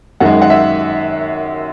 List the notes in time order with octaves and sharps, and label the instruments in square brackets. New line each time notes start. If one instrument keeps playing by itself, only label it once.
[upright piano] F#2 D#3 G#3 F#5
F#5
E5